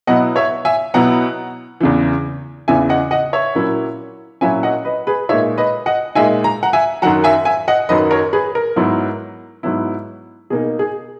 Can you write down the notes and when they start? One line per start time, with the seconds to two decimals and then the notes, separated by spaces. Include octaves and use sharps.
0.07 B2 F#3 B3 E4 D#5 F#5
0.36 C#5 E5
0.65 E5 G#5
0.94 B2 F#3 B3 E4 F#5 A#5
1.80 E2 C#3 E3
2.68 E2 C#3 E3 E5 G#5
2.89 D#5 F#5
3.11 D#5 F#5
3.33 C#5 E5
3.55 A#2 F#3 A#3 C#4 E4
4.41 A#2 F#3 A#3 C#4 E4 E5 G#5
4.63 D#5 F#5
4.85 B4 D#5
5.07 G#4 B4
5.29 A#2 G#3 D#4 C#5 E5
5.58 B4 D#5
5.86 D#5 F#5
6.15 A#2 G#3 D#4 E5 G#5
6.44 A#5
6.63 F#5 A#5
6.73 E5 G#5
7.02 F#2 D#3 F#3 F#5 A#5
7.24 E5 G#5
7.45 E5 G#5
7.68 D#5 F#5
7.89 F#2 D#3 F#3 B4 D#5
8.11 A#4 C#5
8.33 G#4 B4
8.55 A#4
8.76 G#2 F#3 B3 E4
9.63 G#2 F#3 B3 E4
10.50 B2 A#3 D#4 G#4
10.79 G#4